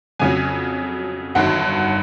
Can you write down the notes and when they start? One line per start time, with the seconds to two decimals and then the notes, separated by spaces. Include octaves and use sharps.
0.19 F2 C#3 F#3 G#5
1.35 G1 G2 D#3 F#3 F#5